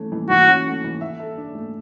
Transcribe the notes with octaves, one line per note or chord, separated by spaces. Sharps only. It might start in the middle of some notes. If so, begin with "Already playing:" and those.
Already playing: E3 A3 C#4
E3
E3 F#4
C#4
A3
E3
E5
A4
D4
A3